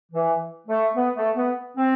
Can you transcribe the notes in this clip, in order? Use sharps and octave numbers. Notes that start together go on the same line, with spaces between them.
E3
A3
B3
A3
B3
C4